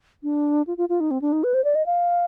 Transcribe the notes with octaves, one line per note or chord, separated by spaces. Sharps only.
D4
F4
F4
F4
D#4
C4
D4
D#4
B4
C5
D5
D#5
F5